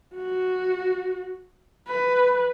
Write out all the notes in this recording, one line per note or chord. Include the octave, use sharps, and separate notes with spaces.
F#4
B4